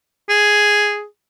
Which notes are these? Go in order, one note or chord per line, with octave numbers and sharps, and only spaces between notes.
G#4